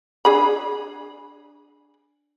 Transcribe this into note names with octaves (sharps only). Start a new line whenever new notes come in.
D4 G#4 B5